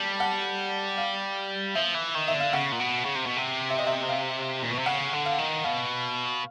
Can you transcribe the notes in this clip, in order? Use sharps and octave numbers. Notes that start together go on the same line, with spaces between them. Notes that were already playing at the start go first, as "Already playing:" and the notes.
Already playing: G3 A5
F#5
F5
F3 E5
E3
D#3
E5
D3
F5
C#3 F#5
A#2
B2
C#3
C3
B2
C3
E5
D#5
E5
F5
A#2
B2
C3
C#3 F#5
D3
F5
D#3
B2 F5